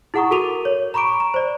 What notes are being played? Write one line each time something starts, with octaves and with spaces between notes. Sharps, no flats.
E4 G#4 F#5 A#5 C#6 D#6
F#4 A4 A#4 D6 D#7 F7
C#5
A#5 B5 C#6 D6 D7
A#5
C5 D5